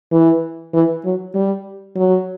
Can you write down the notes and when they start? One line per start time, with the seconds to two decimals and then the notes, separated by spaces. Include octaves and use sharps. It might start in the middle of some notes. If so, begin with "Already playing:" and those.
0.12 E3
0.73 E3
1.05 F#3
1.35 G3
1.97 F#3